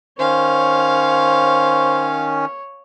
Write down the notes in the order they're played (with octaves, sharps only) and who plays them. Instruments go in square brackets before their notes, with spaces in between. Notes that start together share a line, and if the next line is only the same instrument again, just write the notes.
[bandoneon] D#3 C#4 [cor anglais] C5 [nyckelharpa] C#5 [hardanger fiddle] F5